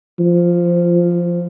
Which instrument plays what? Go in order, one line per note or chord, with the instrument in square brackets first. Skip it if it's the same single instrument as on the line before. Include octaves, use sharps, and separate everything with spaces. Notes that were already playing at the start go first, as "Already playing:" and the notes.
[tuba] F3